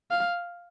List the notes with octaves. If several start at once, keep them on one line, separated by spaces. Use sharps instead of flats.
F5